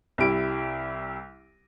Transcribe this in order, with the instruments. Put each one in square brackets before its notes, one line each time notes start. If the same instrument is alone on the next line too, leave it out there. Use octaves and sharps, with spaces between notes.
[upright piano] C2 G3 E4 D7